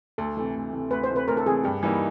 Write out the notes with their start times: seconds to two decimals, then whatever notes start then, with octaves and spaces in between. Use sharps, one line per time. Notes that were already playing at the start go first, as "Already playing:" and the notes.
0.18 D2 A4
0.37 C3 E3 A3
0.55 D2
0.73 C3 E3 A3
0.91 D2 B4
1.04 C5
1.09 C3 E3 A3
1.16 B4
1.28 D2 A#4
1.37 A4
1.46 C3 E3 A3 G#4
1.64 G2 G4
1.83 E3 G3 A#3 D#4